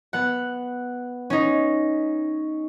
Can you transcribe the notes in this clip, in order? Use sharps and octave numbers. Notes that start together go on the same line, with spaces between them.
B3 F#5
C#4 D#4